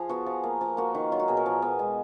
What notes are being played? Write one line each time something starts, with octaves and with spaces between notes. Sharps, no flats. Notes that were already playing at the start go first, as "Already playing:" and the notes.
Already playing: F3 G#4
B3 F#4
F3
A#3
F3
A#3 F#4
D#3
F#3 F4
F#4
B2 G#4
A#4
F3
B3
G#3